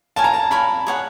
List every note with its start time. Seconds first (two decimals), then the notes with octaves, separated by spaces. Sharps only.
0.16 A#4 C#5 F5 G#5 A5
0.24 A#5
0.34 A5
0.51 A#4 C#5 F5 G#5 B5
0.87 G#4 C#5 F#5